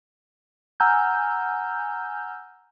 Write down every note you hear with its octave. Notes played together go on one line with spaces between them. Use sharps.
F#5 G#5 A#5 E6 F6 G6